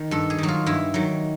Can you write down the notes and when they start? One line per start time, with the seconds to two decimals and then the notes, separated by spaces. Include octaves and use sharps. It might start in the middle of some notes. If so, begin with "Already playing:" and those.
Already playing: D#3
0.11 G2 A4
0.30 G#4
0.39 D#3 F#3
0.48 F4
0.66 G2 E4
0.94 D#3 F#3